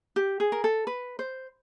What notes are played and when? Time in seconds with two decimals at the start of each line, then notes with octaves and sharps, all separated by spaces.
0.16 G4
0.40 G#4
0.52 A#4
0.64 A4
0.87 B4
1.19 C5